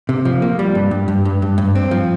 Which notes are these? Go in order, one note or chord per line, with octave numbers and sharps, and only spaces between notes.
C3
F3
A#3
G3
G2
G2
G2
G2
G2
G2
C4
F3